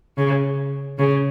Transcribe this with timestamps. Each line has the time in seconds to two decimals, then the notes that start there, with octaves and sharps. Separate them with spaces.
0.18 C#3
0.98 C#3